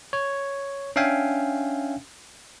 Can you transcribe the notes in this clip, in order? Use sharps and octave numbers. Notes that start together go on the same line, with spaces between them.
C#5
C#4 D4 E5 F5 G5 G#5